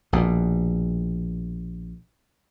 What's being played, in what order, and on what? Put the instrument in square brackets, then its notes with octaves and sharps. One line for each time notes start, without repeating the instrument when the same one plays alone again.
[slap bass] A#1 B2